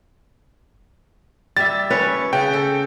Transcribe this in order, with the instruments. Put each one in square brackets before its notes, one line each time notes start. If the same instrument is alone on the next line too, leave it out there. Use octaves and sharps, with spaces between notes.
[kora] G3 E5 [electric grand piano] A6
[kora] C#4 B4 C#5
[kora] C#3 F#5 [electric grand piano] G5
[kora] A4